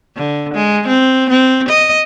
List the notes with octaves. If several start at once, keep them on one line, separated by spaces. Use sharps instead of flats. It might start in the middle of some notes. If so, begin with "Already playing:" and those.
D3
G#3
C4
C4
D#5